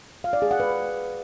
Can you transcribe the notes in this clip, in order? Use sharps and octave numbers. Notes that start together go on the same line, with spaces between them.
F5
D5
G#4
F#5
B4